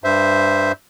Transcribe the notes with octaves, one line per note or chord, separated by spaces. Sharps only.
G2 C5 E5